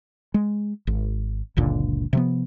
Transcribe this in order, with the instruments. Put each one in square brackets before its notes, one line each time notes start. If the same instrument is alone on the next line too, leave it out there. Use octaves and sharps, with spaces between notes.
[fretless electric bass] G#3
G#1
F#1 C#2 A#2 D3
C3 F3 B3